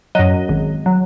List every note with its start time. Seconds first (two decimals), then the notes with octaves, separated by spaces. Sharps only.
0.15 F#2 F#3 D#5
0.49 G#1
0.86 F#3